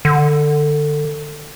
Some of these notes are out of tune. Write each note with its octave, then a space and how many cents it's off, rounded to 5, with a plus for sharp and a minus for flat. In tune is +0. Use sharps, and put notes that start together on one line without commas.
D3 +20